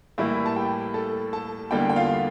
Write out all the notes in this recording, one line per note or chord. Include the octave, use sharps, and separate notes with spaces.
A2 E3 G3 A#3 E4 E5
A5
G4 G5
A4 A5
A4 A5
E2 D3 G3 A#3 G4 G5
G5
F4 F5